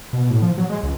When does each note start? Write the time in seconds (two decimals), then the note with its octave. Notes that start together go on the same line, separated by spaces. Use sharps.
0.13 B2
0.30 A2
0.42 F3
0.57 F#3
0.70 G#3
0.83 C#2